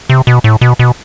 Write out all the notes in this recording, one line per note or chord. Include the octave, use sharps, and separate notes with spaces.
C3
B2
A2
B2
B2